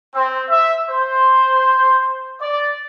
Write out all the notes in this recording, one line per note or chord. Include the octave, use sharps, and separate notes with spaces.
C4
E5
C5
D5